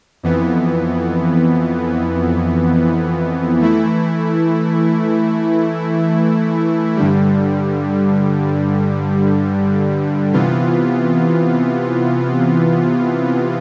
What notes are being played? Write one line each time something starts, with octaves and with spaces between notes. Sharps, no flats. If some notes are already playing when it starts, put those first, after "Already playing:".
F2 E3 B3
E3 A3 E4
G2 D3 G3
C3 E3 B3 F4